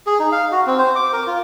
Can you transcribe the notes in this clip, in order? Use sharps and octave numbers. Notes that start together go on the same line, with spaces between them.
G#4
D#4
F5
F#4
C4
C5
D6
A#4
F4